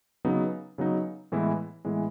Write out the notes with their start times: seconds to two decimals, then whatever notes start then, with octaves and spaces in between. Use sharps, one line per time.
0.25 C#3 F#3 B3 D#4
0.78 C#3 F#3 B3 D#4
1.32 A2 E3 G#3 B3 E4
1.85 A2 E3 G#3 B3 E4